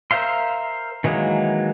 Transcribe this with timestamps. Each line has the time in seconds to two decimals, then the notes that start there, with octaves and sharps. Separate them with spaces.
0.11 A#4 C5 E5 F5 C6
1.04 D#3 E3 F#3 G#3 A#3